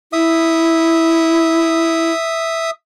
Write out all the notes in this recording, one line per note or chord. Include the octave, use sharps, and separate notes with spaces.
E4 E5 D#6